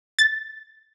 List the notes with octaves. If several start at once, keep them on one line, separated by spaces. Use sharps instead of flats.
A6